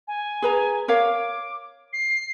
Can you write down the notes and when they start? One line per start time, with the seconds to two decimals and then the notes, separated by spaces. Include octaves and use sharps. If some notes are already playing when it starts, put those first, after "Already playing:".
0.08 G#5
0.42 G#4 B4 A#5
0.88 A#4 C#5 F5 D6
1.93 C7